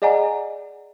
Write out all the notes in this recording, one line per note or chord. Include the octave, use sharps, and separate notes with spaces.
G#4 D5 D#5 F#5 G#5 A#5